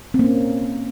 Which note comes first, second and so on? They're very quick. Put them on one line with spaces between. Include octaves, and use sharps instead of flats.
C4 A#3 C#4